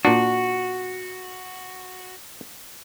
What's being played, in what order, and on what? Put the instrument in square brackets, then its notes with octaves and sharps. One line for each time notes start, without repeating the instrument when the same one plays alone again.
[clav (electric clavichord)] A#2 D4 [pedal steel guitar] F#4